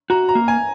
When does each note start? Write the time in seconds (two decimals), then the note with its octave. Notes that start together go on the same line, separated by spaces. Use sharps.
0.10 F#4 A#5
0.29 A#5
0.35 A#3
0.48 G#5